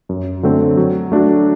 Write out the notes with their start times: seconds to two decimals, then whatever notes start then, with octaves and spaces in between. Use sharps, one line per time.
0.09 F#2
0.43 D3 F#3 A3 C4
0.77 F#3
1.12 A3 D4 F#4